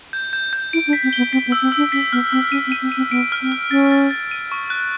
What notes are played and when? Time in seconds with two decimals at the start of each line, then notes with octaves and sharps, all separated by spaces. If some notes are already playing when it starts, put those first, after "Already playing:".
0.13 G6
0.33 G6
0.53 G6
0.73 E4 D7
0.87 D4
0.93 B6
1.03 C4
1.13 B3 G7
1.33 C4 B6
1.47 B3
1.52 E6
1.62 C4
1.72 E6
1.77 D4
1.92 C#4 B6
2.13 B3 F6
2.32 C4 F6
2.51 C#4 D#7
2.67 C4
2.72 D#7
2.82 C4
2.92 D#7
2.97 C4
3.11 B3 D7
3.32 F6
3.42 C4
3.52 F6
3.71 C#4 A6
3.92 A6
4.11 A6
4.31 D#7
4.52 C#6
4.70 F#6